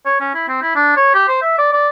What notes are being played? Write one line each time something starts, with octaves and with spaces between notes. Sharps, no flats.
C#5
C#4
E4
C4
E4
D4
C#5
G4
C5
E5
D5
D5